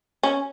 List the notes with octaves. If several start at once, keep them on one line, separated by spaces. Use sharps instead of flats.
C#4